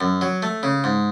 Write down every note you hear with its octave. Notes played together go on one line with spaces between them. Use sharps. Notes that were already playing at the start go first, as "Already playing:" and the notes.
F#2
F#3
A3
C#3
G#2